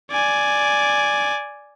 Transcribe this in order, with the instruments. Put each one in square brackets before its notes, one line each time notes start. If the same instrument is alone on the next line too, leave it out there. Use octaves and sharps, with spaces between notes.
[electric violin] D5 G#5